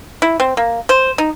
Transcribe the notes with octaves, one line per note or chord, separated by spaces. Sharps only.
E4
C4
A#3
C5
D#4